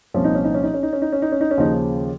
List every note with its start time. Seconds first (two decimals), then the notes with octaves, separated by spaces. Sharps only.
0.14 C2 A#2 F3 C#4
0.24 D#4
0.35 C#4
0.44 D#4
0.54 C#4
0.63 D#4
0.74 C#4
0.83 D#4
0.93 C#4
1.02 D#4
1.12 C#4
1.22 D#4
1.32 C#4
1.41 D#4
1.51 C#4
1.57 D#2 C#3 F3 D#4